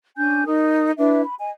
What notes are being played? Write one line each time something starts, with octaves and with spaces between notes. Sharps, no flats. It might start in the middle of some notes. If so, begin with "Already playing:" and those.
C#4 D4 G#5 G6
D#4 A#4 D#6
D4 E4 B4 E5
B5
D#5 G#5